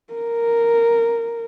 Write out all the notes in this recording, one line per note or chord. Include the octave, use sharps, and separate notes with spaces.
A#4